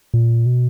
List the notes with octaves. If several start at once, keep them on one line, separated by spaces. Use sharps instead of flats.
A#2
B2